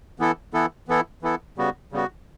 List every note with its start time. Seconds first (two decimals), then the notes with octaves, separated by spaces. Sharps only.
0.19 E3 B3 E4 A4
0.53 E3 B3 E4 A4
0.88 E3 B3 E4 A4
1.22 E3 B3 E4 A4
1.58 C#3 G3 B3 F#4
1.92 C#3 G3 B3 F#4